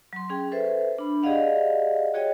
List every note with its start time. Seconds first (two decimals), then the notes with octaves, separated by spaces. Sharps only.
0.13 F#3 C6
0.29 C#4 G#4 G5
0.52 A4 B4 C5 E5
0.98 D4 B5
1.23 G4 G#4 D5 D#5 F5 F#5
2.14 F#4 G#4 C#5 D#5 G5